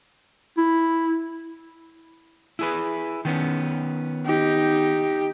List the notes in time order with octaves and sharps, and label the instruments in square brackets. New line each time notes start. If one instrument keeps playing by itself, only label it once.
[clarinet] E4
[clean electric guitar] E4 G#4 B4
D#3 B3 C#4
[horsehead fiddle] D#4 G4